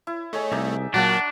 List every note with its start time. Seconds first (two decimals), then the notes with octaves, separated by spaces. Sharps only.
0.07 E4
0.33 A3 G#4 C#5 D#5
0.52 C2 D#4 D5 E5
0.94 A#2 F#3 A#3 D4 F#4 F#5 A5